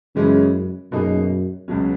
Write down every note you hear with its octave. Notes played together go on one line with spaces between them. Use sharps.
F#2 C#3 E3 G#3 C#4
F#2 B2 A#3 D#4 G#4
C#2 B2 F#3 C#4